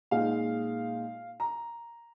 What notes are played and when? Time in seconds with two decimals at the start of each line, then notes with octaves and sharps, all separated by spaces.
0.11 A#2 G#3 D#4 F5
1.40 A#5